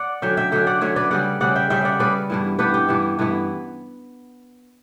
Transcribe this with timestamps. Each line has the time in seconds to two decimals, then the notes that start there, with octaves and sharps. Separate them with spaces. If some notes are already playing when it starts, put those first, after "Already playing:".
Already playing: D5 F#5
0.22 D3 F#3 C#4 E5 G5
0.37 E5 G5
0.52 D3 F#3 C#4 E5 G5
0.67 D5 F#5
0.81 D3 F#3 C#4 C#5 E5
0.96 B4 D5
1.11 C#3 G3 C#4 D5 F#5
1.40 C#3 G3 C#4 D5 F#5
1.55 E5 G5
1.70 C#3 G3 C#4 E5 G5
1.81 D5 E5 F#5
1.99 C#3 G3 C#4 B4 D5
2.30 G2 E3 B3 E4
2.59 G2 E3 B3 E4 G4 B4
2.74 G4
2.88 G2 E3 B3 E4
3.19 G2 E3 B3 E4